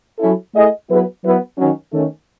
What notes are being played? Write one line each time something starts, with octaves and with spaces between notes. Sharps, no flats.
F#3 C#4 E4 A4
A3 E4 G#4 D#5
F#3 B3 E4 G#4 B4
F#3 B3 E4 B4
D#3 F#3 C#4
D#3 A3 C#4